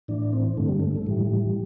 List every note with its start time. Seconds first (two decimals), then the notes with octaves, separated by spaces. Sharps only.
0.08 A2 E3 D4
0.33 C4
0.57 G2 D3 A3
0.69 G3
0.80 A3
0.95 A3
1.06 A2 E3 G3